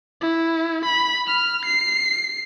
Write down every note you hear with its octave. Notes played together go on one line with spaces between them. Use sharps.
E4
B5
F6
C7